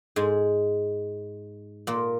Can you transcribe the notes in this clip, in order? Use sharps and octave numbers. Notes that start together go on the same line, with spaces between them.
G#2 G#3
A#2 A#3